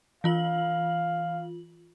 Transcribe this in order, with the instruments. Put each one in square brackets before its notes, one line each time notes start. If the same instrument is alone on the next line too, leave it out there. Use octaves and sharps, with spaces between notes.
[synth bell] E3 F4 F#7 [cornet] F5